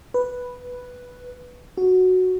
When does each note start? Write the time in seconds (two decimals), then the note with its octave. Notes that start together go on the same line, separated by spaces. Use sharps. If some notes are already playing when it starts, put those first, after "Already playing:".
0.14 B4
1.78 F#4